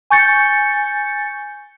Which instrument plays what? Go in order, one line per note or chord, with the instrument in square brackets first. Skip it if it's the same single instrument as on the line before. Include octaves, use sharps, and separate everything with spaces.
[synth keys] G#5 C#6 G6 A6 C#7